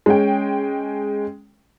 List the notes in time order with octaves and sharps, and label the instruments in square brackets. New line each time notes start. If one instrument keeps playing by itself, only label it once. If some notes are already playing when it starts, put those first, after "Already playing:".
[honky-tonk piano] G#3 C#4 G5